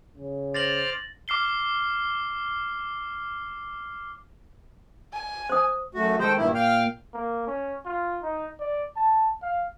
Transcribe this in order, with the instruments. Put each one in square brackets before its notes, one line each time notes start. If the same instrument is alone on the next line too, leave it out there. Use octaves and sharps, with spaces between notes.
[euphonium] C#3
[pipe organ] C5 D5 F6 [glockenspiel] A6 A#6 F#7
[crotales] D6 F6 C7 G7
[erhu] G#5
[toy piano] C5 D#6
[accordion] F#2 A3 F#4
[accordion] D#3 C5 G5 [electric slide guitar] G#3 D#4 A4
[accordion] G2 D#3 E4 [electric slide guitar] A#2 A#3
[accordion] F5 G5 F6
[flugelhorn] A#3
C#4
F4
D#4
D5
A5
F5